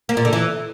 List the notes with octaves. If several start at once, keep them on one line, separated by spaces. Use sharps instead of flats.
A#3
A#2
D3
E3